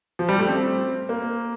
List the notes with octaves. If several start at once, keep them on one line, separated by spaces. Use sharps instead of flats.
F3
G3
A3
C4
A#3